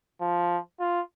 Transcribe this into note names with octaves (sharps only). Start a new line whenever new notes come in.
F3
F4